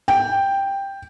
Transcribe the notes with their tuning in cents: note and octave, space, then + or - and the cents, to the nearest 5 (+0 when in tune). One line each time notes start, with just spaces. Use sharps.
G5 +5